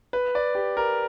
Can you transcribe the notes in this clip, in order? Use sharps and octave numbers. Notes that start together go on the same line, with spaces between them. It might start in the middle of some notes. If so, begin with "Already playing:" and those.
B4
D5
G4
A#4